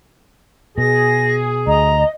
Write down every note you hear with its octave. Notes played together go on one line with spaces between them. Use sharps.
B2 G#4 A#6
D2 D#5 A#5